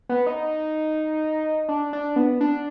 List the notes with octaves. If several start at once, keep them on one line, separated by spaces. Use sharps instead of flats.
B3
D#4
D4
D4
B3
D4